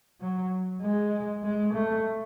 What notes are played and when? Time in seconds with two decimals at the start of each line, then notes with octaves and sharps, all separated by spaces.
0.21 F#3
0.82 G#3
1.43 G#3
1.73 A3